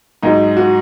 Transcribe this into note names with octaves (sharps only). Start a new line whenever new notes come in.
G#2 F#3 D#4
F#4